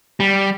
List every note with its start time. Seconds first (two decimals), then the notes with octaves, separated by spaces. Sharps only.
0.20 G3